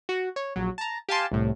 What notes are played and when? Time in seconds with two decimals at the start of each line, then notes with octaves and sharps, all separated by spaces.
0.09 F#4
0.36 C#5
0.56 A#1 F#3
0.78 A5 A#5
1.09 G4 F5 G#5 A5 C6
1.32 C2 A2